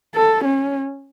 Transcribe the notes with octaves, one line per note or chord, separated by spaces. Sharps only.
A4
C#4